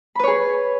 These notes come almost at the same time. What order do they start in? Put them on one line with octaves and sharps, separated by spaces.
B5 B4 C#5 G#4